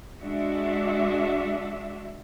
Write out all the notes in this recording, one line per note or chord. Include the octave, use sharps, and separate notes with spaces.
G#3 D4 F#4 E5